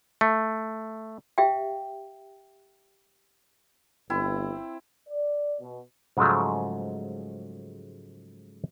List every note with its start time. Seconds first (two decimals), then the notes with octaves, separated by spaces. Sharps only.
0.21 A3
1.38 G4 E5 F5 G5
4.10 G1 C4 E4
5.09 D5
5.61 B2
6.17 G#2 C#3 F3 F#3 G#3 A3